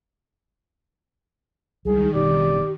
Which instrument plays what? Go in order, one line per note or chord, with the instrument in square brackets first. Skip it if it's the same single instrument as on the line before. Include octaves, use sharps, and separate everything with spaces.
[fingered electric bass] C#2 G3 [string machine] D#3 [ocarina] G#4
[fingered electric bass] F#1 B2 C#4 [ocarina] G4 [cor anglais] D5